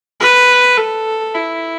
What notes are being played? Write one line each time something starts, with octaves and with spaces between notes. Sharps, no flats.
B4
A4
E4